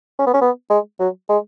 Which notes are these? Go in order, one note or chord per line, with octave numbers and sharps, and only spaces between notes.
C#4
B3
C#4
B3
G#3
F#3
G#3